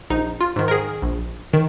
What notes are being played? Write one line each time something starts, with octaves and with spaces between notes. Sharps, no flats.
A#1 D#4
F4
G#2 D#3
A#4
G#4
A#1
D#3